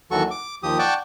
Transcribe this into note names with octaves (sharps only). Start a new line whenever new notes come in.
D#2 E3 F#3 F#4 A4 C#6
D6
D#2 F3 G4 D#6
D5 F#5 G5 A5 C#6 D6